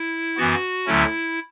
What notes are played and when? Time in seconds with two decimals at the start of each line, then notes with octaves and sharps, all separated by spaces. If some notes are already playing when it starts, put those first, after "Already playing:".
Already playing: E4
0.37 F#2 E3 B3 F#4
0.86 D2 D3 F#3 A3 C#4 E4